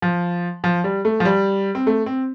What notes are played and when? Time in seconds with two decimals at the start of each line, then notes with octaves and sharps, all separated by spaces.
0.02 F3
0.64 F3
0.84 G3
1.05 A3
1.20 F3
1.25 G3
1.75 C4
1.87 A3
2.06 C4